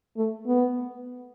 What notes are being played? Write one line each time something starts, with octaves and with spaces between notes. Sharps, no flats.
A3
B3